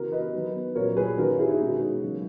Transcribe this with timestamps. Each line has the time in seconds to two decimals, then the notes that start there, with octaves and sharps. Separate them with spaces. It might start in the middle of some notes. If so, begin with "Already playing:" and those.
Already playing: C#3 E3 B3 F#4 A#4
0.12 B4 D#5
0.34 D#3 F#3 B3
0.75 A#2 F#3 C#4 A#4 C#5
0.97 G#4 B4
1.17 D#3 A#3 C#4 F#4 A#4
1.38 E4 G#4
1.49 D#4 F#4
1.61 B2 G#3 C#4
2.02 C#3 F#3 A#3